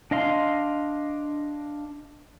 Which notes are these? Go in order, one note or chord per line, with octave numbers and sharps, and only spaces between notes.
D4 D#5 F5 C6